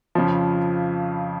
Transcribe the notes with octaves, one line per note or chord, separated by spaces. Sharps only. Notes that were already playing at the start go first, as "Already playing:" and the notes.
F2 C#3 F3